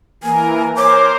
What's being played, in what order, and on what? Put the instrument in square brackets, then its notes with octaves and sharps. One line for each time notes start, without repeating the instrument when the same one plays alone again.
[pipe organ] E3 A#4 [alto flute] A#3 [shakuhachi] G#5
[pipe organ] A#4 C5 [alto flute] C#5 [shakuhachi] D6